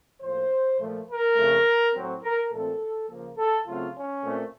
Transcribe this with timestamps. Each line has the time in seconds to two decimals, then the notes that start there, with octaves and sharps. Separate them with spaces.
0.21 A2 F3 A#3 C5
0.78 A#2 F3 A3
1.07 A#4
1.36 F2 C#3 A3
1.93 A2 F#3 C4
2.22 A#4
2.50 A#2 F3 A3 C4 A4
3.08 C#3 F3 A#3
3.37 A4
3.66 C#3 F#3 A3 C4 F4
3.94 C#4
4.22 A#2 A3 C4